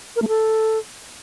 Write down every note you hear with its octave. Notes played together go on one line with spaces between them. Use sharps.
A#4
A3
A4